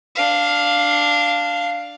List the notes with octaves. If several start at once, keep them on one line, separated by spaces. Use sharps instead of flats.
D4 F5